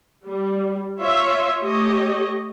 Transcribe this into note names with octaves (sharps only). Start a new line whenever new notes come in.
G3
F4 C#5 E5
A3 G4 C#5 D#5